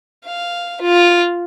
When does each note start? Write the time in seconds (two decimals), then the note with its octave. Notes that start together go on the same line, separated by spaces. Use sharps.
0.25 F5
0.81 F4